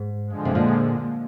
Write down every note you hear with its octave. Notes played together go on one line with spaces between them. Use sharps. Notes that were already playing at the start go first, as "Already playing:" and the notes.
Already playing: G#2
D3 F3 G#3
C3
A#2